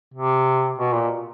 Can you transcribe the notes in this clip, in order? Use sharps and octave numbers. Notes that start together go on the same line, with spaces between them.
C3
B2
A#2